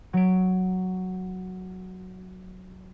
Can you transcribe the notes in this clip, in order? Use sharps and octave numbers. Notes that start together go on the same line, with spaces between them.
F#3 D7